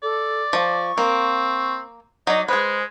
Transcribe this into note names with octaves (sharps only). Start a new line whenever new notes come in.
A4 D5
F3 A5 C#6
A#3 C4
F#3 D#4 D5 D#5
G#3 G#4 B4 C5